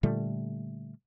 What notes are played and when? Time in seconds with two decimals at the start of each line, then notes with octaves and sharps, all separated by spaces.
0.03 A#2 D3 G3 A3